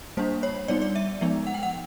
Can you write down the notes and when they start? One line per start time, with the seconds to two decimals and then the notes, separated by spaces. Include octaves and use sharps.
0.17 G3 A#3 D4 C5
0.43 C#5
0.68 G3 B3 D#4 D5
0.82 D5
0.95 E5
1.21 F3 G#3 B3 D#4
1.47 F#5
1.54 G5
1.63 F#5